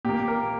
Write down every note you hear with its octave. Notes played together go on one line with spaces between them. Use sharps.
A#2 A#3 G4
A#4